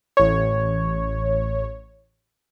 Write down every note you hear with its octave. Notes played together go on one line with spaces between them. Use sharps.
A1 C#5